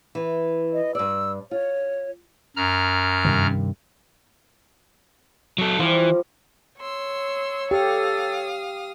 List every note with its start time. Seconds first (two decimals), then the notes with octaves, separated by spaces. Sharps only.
0.15 E3
0.73 D#5
0.95 G2 D5 E6
1.51 F4 C#5
2.56 F#2 A#5 F6
3.24 G2 C3 D#3
5.58 F#3 A4
5.79 E3 F3 G3
6.81 C#5 C6 E6
7.71 G4 A4 F5 D#6